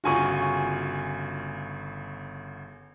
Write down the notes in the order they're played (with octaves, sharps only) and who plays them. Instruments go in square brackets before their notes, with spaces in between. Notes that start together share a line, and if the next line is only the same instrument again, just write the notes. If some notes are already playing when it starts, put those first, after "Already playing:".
[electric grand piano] G1 C#3 F#4 [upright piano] F4 G#5 C#6